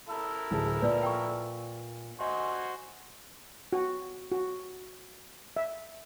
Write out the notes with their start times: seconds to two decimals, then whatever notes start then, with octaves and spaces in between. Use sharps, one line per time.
0.09 E4 A4 A#4
0.51 D1 G#4 A5
0.82 A#2 B4 D5 F5
1.03 G5 C#6
2.20 F#4 C5 D#5 F#5 G#5
3.73 F#4
4.32 F#4
5.56 E5